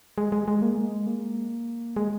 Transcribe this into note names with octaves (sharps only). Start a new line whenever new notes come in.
G#3
G#3
G#3
A#3
G#3
A#3
G#3